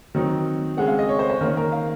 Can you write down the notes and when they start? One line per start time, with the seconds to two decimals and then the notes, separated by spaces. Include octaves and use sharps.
0.15 D#3 F#3 C4 D#4
0.77 C#3 G#3 C4 F#5
0.88 F5
0.99 D#5
1.09 C#5
1.19 C5
1.30 C5
1.41 D#3 A#3 C#4 A#4
1.57 A#4
1.72 F5